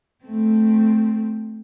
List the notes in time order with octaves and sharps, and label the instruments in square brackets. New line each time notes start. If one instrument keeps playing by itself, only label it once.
[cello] A3 C4